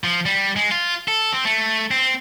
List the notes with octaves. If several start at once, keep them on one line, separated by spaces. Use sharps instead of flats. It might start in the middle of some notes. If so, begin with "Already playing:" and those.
F3
G3
G#3
F4
A4
C4
A3
C4